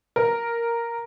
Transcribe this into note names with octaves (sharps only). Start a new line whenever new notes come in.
A#4